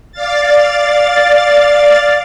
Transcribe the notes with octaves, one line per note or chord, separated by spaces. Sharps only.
D5 F5 A6